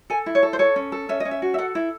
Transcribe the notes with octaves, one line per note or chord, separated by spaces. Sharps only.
A4 G#5
E4
C#5
A4
C5
A4 C#5
C#4
A4
C#4 E5
C#4 D#5
E5
F#4
E5
A4 F#5
E4